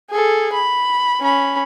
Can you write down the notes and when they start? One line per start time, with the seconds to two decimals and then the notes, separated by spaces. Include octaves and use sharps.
0.11 G#4 A4
0.53 B5
1.21 C#4 B5